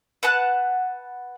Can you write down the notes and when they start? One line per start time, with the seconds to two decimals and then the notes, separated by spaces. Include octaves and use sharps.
0.23 B4 F#5 A5 F#6